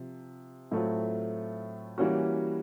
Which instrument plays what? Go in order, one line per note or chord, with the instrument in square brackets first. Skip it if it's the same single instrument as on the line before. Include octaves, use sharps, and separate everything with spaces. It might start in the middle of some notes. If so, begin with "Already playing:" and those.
Already playing: [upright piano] C3 F3
A2 F#3 A3 C4 F4
E3 G3 A#3 C#4 F#4